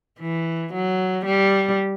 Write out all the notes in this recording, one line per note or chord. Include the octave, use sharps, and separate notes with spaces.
E3
F#3
G3